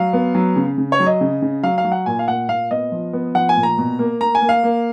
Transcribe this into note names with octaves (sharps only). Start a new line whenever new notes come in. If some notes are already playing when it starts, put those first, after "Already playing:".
Already playing: F#3 F5
B3
F#3
C#3
C#3
C#5
F#3
D#5
C#3
C#3
F#3 F5
F5
F#3
F#5
A#2 G#5
F5
A#2 F#5
A#2 F5
B3 D#5
F3
B3
F3 F#5
G#5
A#2
A#5
B2
A#3
A#3 A#5
G#5
A#3
F5
A#3